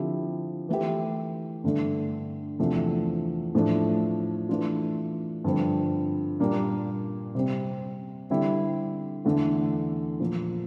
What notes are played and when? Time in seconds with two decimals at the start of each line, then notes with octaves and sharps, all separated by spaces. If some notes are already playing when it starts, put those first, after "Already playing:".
Already playing: D3 F3 C4 E4 G4
0.69 E3 A3 E4 G4
1.64 G2 D3 A3 D4
2.59 E2 C3 F3 A3 D4
3.55 A2 F3 A3 D4
4.49 E3 A3 D4 F4
5.44 G2 D3 F3 C4
6.40 A#2 G3 A#3 D4
7.35 C3 G3 C4
8.30 D3 G3 C4 E4 G4
9.25 E2 D3 A3 D4
10.20 A#2 F3 A#3